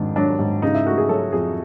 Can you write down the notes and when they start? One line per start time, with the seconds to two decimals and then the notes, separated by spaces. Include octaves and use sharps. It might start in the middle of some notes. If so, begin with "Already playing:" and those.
Already playing: F2 G#2 D#3 D4
0.16 F#3 D4
0.39 G#2
0.62 C#3 D#4
0.75 E4
0.86 A3 F#4
0.98 G#4
1.09 F#3 A4
1.32 F2 G#4